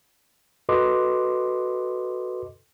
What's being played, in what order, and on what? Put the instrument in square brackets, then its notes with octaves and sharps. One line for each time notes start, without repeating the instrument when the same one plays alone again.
[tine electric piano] F#4 A4 B4 D#5 C6 D6